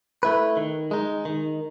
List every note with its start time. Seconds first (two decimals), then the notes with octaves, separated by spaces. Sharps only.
0.23 A3 E4 B4
0.57 D#3
0.91 G#3 D#4
1.25 D#3